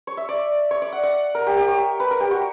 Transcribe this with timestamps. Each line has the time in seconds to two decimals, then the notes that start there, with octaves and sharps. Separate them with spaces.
0.07 C#5
0.17 E5
0.29 D5
0.71 C#5
0.82 D5
0.92 F#5
1.03 F#5
1.35 A#4
1.47 G4
1.57 G4
1.68 C#5
2.00 B4
2.11 A#4
2.20 G4
2.31 F#4